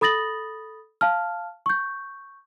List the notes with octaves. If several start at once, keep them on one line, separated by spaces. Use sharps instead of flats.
A4 B5 D#6 A6 A#6 F#7
F5 A5 F6
C#6 G6